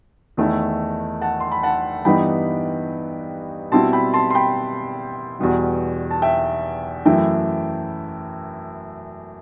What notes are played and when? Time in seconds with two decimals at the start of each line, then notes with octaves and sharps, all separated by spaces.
0.37 E2 D#3 A3 E4
1.21 F#5 A5
1.40 C6
1.52 B5
1.63 F#5 A5
2.05 G2 E3 B3 D#4 G5 B5
3.72 B2 G3 C4 E4 A5 C6
3.93 G5 B5
4.14 A5 C6
4.30 C6
4.35 G5 B5
5.39 E2 B2 G3
6.11 A5
6.22 E5 G5
7.05 F#2 E3 A3 E4 E5 G5